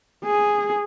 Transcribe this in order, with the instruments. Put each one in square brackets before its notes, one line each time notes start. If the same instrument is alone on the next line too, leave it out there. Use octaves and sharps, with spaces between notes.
[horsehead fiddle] G#4